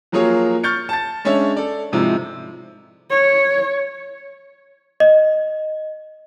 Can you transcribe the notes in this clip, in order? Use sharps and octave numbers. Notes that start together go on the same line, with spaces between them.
F3 F#3 A#3 F4 G#4 C#5
C#6 F6 G6 A6 C#7
A5 A6
G#3 C#4 D4 C#5 E5
A4 D5
G#2 C3 F3 D#4 E4
C#5
D#5